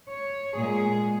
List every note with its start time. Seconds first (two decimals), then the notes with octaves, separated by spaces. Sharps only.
0.11 C#5
0.56 A#2 G#3 G#4